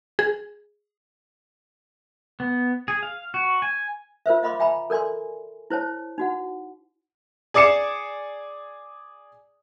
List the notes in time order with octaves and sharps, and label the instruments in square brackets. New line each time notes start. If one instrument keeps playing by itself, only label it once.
[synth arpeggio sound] G#4
[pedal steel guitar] B3
G#4
F5
F#4
G#5
[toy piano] F4 A#4 C5 E5
D#5 F5 B5 C6 D6
E5 G5 G#5 A#5 B5
A4 A#4 D5 G#5 C6
E4 C5 C#5 A5
D#4 F#4 F#5
[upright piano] G#4 D5 D6 C7 C#7 E7